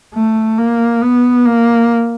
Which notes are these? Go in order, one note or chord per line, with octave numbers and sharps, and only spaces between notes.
A3
A#3
B3
A#3